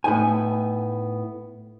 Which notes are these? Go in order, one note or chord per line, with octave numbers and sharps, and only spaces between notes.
A2 B3 D#4 G#5